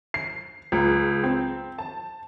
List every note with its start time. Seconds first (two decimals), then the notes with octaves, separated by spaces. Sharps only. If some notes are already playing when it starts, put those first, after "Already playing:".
0.14 C7
0.72 C#2
1.24 C4
1.78 A5